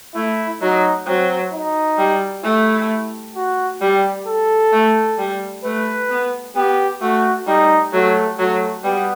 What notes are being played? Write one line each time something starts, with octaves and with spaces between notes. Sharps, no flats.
A3 E4
F#3 D#4
F#3 C4
D#4
G3
A3 E4
F#4
G3 G4
A4
A3
G3
A3 B4
B3
B3 G4
A3 F#4
G3 D#4
F#3 A3
F#3 A3
G3 B3